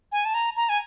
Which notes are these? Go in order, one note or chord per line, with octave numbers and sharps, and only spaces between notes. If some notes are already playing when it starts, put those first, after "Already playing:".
G#5
A5
A#5
A#5
G#5